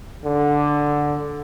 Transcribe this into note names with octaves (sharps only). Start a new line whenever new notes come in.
D3